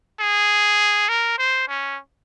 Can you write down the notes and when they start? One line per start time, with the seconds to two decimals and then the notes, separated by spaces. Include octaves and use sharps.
0.20 G#4
1.09 A#4
1.38 C5
1.68 C#4